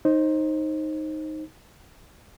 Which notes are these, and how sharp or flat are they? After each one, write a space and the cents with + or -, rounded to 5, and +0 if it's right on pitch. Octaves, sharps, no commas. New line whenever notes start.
D#4 +0 C5 +25